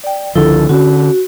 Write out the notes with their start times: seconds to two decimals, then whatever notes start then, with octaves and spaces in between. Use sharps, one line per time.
0.04 D5 G5
0.36 C#2 D3 F3 E4 A4
0.69 D3 C#4 F#4